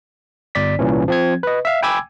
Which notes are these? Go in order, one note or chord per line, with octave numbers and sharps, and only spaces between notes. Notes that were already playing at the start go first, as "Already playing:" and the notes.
G1 D5 B6
C2 A#2 E3 C#4
F3 C4 G#6
B4 D#5
E5 F5
G5 G#5 B5 D6 E6 G#6